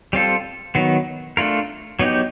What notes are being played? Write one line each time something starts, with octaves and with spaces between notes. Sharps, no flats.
G3 C4 F4 A4
D#3 F#3 B3
A3 D4 F4 A#4
F#3 B3 D#4 G4